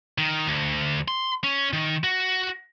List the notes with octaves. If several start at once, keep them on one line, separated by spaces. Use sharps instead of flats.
D#3
D2
C6
C#4
D#3
F#4